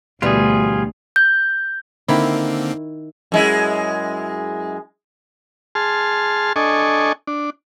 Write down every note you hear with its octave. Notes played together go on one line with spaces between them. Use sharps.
D2 B2 E3 G3 F4 G#4
G6
D3 D#3 A#3 C4 E4
F#2 G#3 E4
G#4 A5 C6 F6
D4 A4 D#5 G#5 C#6
D4